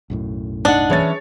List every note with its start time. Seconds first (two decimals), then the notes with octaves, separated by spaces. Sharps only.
0.10 B1 F#2 A2
0.65 D4 D#4 F#5
0.90 E3 C#4 G#4 C#5 A6